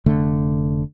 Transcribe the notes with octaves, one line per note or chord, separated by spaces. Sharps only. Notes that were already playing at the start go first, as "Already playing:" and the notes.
F1 D3 A3